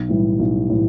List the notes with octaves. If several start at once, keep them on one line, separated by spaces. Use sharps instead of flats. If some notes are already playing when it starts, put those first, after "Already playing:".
Already playing: B1
A2 E3 G3
B1
A2 E3